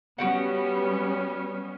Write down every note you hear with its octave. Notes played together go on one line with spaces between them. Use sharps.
G3 B3 C#4 F#4 G4 F#5